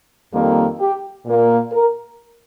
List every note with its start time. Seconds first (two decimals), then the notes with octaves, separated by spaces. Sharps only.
0.34 F2 D#3 G3 A#3
0.80 G4
1.26 A#2 A#3
1.72 A#4